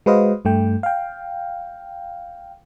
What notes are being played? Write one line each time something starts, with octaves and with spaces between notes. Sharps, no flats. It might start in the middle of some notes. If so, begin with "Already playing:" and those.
G#3 F#4 B4 C5 D#5 F5
G2 A3 G5
F5 G5